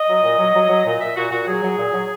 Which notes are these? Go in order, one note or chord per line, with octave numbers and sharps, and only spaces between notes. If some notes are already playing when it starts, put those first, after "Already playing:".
Already playing: D#5
F#3
A#2
F#3
F#3
F#3
A#2
A#2 E5
A#2 F#4
A#2 F#4
F#3 G#4
F#3
A#2
F#3